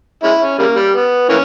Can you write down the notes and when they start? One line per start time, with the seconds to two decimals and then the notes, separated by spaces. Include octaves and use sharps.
0.23 G#3 C#4 E4
0.41 C#4
0.58 C#3 G3 A#3
0.75 G3
0.93 B3
1.29 E3 A#3 C#4